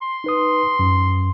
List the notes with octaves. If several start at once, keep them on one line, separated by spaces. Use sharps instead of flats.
C6
D#4 B4 D#6
F#2